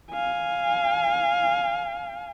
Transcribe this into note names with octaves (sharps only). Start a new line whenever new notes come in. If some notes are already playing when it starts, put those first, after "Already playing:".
F5 G#5